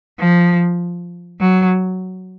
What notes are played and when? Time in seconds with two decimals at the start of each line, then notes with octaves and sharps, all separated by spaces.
0.19 F3
1.41 F#3